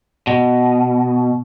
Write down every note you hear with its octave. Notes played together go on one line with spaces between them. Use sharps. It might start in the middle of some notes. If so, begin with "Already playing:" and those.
B2